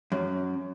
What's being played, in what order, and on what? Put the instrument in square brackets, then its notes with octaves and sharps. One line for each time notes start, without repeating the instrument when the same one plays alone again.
[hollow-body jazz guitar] F#2